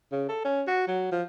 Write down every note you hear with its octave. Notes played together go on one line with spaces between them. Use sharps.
C#3
A4
C#4
F#4
F#3
F3